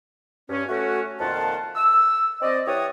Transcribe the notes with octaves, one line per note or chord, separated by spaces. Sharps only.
G2 C#4
A3 C#4 F#4
F2 A#2 D#3 F4 F#5 A5
E6
C4 D5 D#5
E3 G4 C#5 F#5 D#6